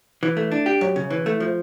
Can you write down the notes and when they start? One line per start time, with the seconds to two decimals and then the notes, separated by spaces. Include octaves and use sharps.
0.23 E3
0.37 A3
0.51 D4
0.66 G4
0.81 F#2
0.96 C#3
1.10 E3
1.26 A3
1.40 F3